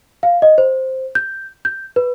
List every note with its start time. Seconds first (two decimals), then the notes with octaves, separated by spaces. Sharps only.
0.23 F5
0.42 D#5
0.58 C5
1.15 G6
1.65 G6
1.96 B4